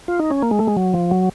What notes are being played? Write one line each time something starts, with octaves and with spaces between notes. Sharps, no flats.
F4
D#4
C#4
A#3
G#3
A3
G#3
F#3
F3
F#3